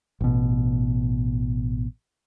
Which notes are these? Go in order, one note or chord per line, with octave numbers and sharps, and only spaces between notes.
A1 B2